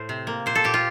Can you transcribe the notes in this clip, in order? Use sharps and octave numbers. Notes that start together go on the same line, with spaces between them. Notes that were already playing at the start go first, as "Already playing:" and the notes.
Already playing: A2 C5
C3
A#3
A#2 C5
A4
A#2 G4
F4